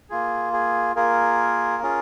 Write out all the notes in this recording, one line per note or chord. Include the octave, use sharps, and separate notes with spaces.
A#3 F4 G#4
G#4
A#3 F4 G#4 A#4
C#4 F4 G#4